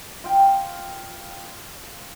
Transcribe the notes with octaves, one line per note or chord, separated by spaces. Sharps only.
F4 F5 G5